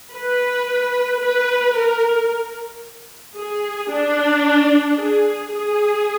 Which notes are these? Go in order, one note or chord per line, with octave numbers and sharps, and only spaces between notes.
B4
B4
A#4
G#4
D4
G#4
G#4